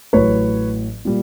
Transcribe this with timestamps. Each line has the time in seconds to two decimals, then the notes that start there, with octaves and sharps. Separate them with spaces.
0.13 A1 A2 F#3 B4 C#5
1.05 A#2 G3